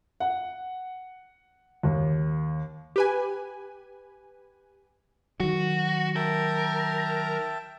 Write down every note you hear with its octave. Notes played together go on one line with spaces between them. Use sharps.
F#5
D#2
G4 B4 G#5
D#3 F#3 F#4
A#4 E5 G5 A5